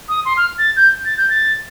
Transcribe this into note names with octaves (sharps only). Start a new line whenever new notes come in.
D#6
C6
F6
A6
G6
A6
G6
A6